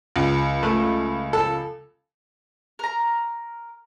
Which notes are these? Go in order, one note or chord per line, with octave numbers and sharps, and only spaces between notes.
C#2
A3
A4
A#4 A#5